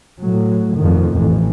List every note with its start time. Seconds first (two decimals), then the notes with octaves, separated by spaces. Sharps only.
0.21 A2 F#3
0.77 F2 A2 D#3
1.16 A1 F2 E3